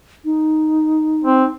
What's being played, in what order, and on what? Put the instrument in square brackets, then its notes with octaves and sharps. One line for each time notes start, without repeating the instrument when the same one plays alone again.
[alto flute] D#4
[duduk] C4